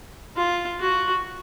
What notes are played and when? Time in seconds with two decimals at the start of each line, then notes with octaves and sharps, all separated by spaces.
0.37 F4
0.80 F#4